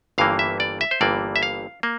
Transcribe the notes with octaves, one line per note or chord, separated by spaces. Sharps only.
G1 G2 E3 A#3 F5
E5
D5
E5
C5
G1 G2 E3 A#3 D5
E5
F5
A#3